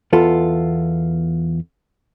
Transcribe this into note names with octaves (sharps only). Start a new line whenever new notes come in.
E2 B3 F4 A4